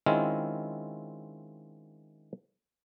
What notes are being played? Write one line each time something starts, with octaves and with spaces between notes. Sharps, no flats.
D#3 G#3 C4 C#4 E4 F4